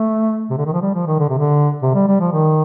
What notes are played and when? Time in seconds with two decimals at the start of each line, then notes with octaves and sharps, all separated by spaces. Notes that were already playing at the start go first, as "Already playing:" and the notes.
Already playing: A3
0.50 C3
0.58 D3
0.66 D#3
0.73 F3
0.82 G3
0.94 F3
1.07 D#3
1.19 D3
1.29 C3
1.39 D3
1.82 C3
1.94 G3
2.07 G3
2.20 F3
2.32 D#3